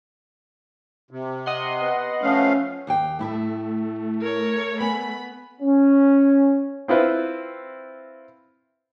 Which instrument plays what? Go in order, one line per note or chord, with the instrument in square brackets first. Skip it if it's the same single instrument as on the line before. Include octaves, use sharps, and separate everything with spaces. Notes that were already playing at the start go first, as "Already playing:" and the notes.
[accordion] C3
[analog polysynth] D#5 F#5 C6
[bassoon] B3
[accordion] F3 A3 F5 [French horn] C#4
[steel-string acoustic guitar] D#2 F5 G5
[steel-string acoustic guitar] A2 E4 E5 [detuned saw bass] A3
[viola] A#4 C#5
[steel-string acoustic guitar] B3 G#5 [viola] B5
[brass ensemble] C#4
[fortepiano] C4 E4 F4 B4 C5